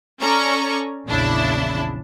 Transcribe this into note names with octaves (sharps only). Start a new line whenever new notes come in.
C#4 A4 D5 A#5 C#6
A#1 E2 C#3 D4 E4 A5